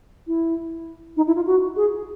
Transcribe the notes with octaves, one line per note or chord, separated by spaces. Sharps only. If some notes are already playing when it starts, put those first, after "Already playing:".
E4
D#4
E4
F4
F#4
G#4